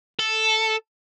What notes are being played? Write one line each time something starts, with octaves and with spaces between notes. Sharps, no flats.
A4